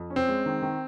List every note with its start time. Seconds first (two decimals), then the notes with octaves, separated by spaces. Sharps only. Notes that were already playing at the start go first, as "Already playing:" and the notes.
Already playing: F2
0.10 C#4
0.16 C4
0.28 G#3
0.46 D#3
0.62 D#3